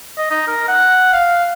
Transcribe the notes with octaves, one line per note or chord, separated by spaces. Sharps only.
D#5
D#4
A#4
F#5
F5